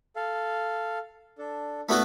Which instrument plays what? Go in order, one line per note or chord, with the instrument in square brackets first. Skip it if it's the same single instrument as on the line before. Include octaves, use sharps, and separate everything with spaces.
[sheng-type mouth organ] A4 F5
D4 A4
[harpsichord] A3 B3 F#4 [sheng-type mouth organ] D4 E4